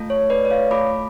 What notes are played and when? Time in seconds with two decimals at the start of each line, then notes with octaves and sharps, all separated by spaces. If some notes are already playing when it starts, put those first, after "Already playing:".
Already playing: A3 F4 A4
0.10 C#5
0.30 B4 D5
0.45 D5
0.50 C#5 F5
0.70 A3 F4 A4 B5 D6